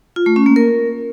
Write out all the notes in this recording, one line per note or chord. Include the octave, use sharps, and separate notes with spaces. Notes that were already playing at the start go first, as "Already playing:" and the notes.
F4
A3
C#4
A#3
A#4